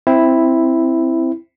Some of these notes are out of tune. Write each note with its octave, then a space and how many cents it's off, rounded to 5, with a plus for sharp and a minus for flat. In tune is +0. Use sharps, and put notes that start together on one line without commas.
C4 +0 E4 +0